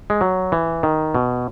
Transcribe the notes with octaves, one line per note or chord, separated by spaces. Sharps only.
G#3
F#3
E3
D#3
B2